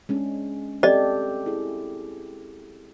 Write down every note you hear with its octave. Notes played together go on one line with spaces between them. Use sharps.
G#3 C#4 D4
C4 G4 A4 D5 D#5
E4 G#4